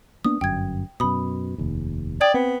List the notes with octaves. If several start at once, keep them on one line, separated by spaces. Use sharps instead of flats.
A#3 B3 D4 D#6
G1 F#2 G5 G#6
F#2 B2 B5 D#6
F1 D#2
D5 G5 D#6 G#6
B3 C4